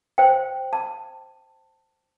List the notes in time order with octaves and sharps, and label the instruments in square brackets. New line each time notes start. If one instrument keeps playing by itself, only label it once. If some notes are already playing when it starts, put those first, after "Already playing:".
[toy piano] C5 G5
A5